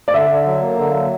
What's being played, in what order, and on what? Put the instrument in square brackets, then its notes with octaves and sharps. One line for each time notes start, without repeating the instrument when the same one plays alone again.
[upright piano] D5
[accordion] D3 [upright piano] E5
[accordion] D3
F#3
A#3
D3
F#3